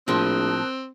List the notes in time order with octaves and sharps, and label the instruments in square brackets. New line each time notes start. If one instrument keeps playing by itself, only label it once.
[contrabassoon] A#1 [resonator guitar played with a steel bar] A2 F3 [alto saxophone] C4 [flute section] A#4 D#6 F#6